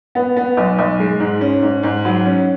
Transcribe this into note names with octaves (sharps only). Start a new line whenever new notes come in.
B3
B3
B1
B1
G#3
G#2
C#4
G#2
G#2
F#3
C#4